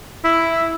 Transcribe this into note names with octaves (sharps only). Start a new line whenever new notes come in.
E4